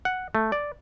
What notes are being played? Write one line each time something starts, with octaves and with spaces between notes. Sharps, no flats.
F#5
A3
D5